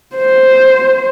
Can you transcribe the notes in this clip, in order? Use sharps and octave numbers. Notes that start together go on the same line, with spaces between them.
C5